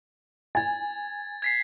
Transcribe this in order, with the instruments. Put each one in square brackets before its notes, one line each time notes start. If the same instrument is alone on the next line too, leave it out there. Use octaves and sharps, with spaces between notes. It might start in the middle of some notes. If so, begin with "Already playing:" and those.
[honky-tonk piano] G#5 [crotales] G#6 A6
[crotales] G#6 B6 C7